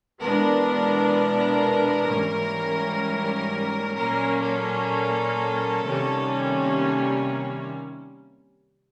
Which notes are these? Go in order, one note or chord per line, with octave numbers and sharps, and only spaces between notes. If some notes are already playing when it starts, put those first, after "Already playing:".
E2 B2 G#3 B3 D4 A#4
G#2 E3 G3 A#3 C#4
A#2 F#3 A#3 C#4 A#4
A4
C3 D#3 G3 A#3 C#4